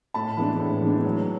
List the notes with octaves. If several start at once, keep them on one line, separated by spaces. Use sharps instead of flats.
A2 A5 B5
E3 G#3 B3 D4
A2
E3 G#3 B3 D4
F#3